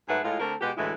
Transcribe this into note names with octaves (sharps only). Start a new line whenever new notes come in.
G#2 F#3 A3 G#4 B4 F#5
A2 G#3 F4
D3 A3 C4 A#4
B2 G#3 F#4 G4
D2 A2 E3 G#3 E4